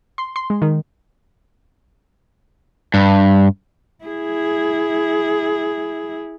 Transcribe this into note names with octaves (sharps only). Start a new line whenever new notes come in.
C6
C6
G#3
D#3
G2
E4 G#4